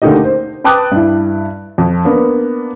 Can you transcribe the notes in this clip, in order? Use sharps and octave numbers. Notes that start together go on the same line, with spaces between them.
D3 A3 A#3 D#4 G4 D#5
C5
B4 G5 A5 D6 D#6 F#6
G2 E4
F2
A#3 B3 D4